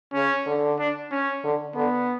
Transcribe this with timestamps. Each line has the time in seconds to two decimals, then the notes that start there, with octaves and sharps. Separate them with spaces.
0.13 C#3 C#4
0.46 D3
0.79 D4
1.12 C#4
1.44 D3
1.76 D3 B3